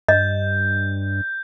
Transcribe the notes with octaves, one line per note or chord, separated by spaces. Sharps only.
G2 D#5 G6